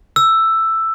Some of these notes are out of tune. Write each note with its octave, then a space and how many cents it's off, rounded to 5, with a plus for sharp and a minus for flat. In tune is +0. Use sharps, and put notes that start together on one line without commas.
E6 +5